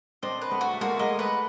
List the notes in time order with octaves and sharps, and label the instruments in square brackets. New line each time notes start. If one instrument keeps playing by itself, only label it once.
[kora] C4 D4 [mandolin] D#5
[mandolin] B4
[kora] A3 B3
[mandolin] F#4
[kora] A3
[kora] G#3 A#3 [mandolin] F#4
[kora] A3
[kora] G#3 A#3 [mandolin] D#5
[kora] A3 B3 [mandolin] B4